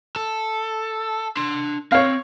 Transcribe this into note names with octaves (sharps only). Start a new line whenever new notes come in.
A4
D4 C6
C4 C#5 F5